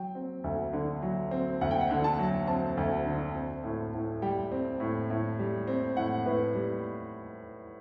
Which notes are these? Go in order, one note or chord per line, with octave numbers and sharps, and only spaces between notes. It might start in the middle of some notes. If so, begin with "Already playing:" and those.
Already playing: F#3 G5
C4
D2
D3
F#3
C4
D2 F#5
G5
F#5
D3
A5
F#3
C4 A5
D2
D3
C4
A2
A2
G3 G5
C4
A2
A2
G3
C4
A2 F#5
A2 B4
G3